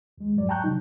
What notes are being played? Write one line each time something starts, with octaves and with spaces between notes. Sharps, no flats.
D#2 G#3
F2 G#2 F#3 D5
G5 A5 A#5 C#6 F#6 G6
C3 F#3 D#4